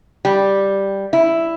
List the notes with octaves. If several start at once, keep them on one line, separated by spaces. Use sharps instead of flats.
G3
E4